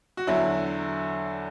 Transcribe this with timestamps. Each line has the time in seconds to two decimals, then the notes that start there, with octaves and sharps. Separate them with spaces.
0.17 F#4
0.27 E2 D3 F#3 E4